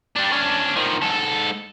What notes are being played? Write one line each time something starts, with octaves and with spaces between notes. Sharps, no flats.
G3 D4
C#4 D4
D#3 F3
G#2 A4